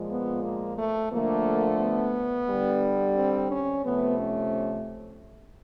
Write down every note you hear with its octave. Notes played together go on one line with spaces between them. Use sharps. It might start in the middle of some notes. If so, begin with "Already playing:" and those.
Already playing: A#2 F3 G#3
B3
A#3
A3
D3 F3 A3 A#3
B3
D3 G3
C4
C#4
C3 F3 A3 B3
C#4